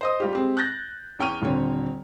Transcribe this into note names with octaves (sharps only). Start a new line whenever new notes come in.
C5 D#5 D#6
G3 F4 G4
G#3 C4 G4
F#6 G6 A6 A#6
E2 C#4 G5 C#6 F6 D#7
D#1 D3 C4 C#5